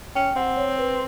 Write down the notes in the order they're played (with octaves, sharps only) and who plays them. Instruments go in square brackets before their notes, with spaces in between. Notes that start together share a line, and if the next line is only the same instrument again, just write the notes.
[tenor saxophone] C#4 [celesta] G5
[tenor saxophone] C4 [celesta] F#5
[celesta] C#5
B4